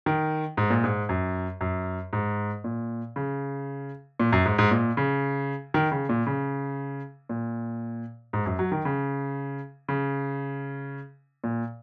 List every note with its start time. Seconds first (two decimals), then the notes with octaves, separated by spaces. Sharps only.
0.06 D#3
0.57 G#2
0.70 A#2
0.84 G#2
1.09 F#2
1.61 F#2
2.13 G#2
2.64 A#2
3.16 C#3
4.20 A#2
4.32 F#2
4.45 G#2
4.58 G#2
4.71 A#2
4.97 C#3
5.74 D#3
5.92 C#3
6.09 A#2
6.27 C#3
7.29 A#2
8.33 G#2
8.46 F#2
8.59 F#3
8.72 D#3
8.85 C#3
9.89 C#3
11.44 A#2